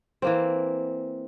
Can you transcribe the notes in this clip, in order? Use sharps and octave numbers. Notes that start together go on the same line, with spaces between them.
E3 A#3 C4